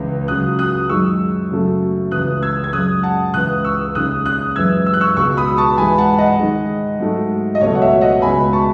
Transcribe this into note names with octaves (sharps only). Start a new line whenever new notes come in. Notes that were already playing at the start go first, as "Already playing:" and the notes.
Already playing: C#2 C#3 E3
C#2 C#3 F#3 D#6 F#6
D#6 F#6
F#2 D#3 G#3 C#6 E6
F#2 C#3 F#3 A3
C#2 C#3 E3 D#6 F#6
E6 G#6
G#6
F#2 C#3 G#3 D#6 F#6
F#5 A5
C#2 C#3 E3 D#6 F#6
C#6 E6
D#2 C#3 G#3 D#6 F#6
D#6 F#6
F#2 E3 G#3 E6 G#6
E6
F#6
C#6 E6
C#2 B2 G#3 C#6 E6
B5 D#6
A5 C#6
G#2 E3 G#3 G#5 B5
F#5 A5
D#5 F#5
G#2 D#3 G#3
G#2 F#3 A3
D#5
C#2 B2 F#3 A3 C#5
F#5
C#5 E5
D#5 F#5
C#2 B2 G#3 G#5 B5
A5 C#6